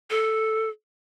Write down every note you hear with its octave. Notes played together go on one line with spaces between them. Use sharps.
A4